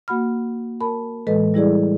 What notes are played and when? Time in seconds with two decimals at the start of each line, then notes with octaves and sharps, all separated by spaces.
0.08 A#3 F#4 F#5 B5 F6
0.81 A#4 A5 B5
1.27 A2 E3 G#3 A4 B4 D#5
1.54 G3 E4 G#4 D5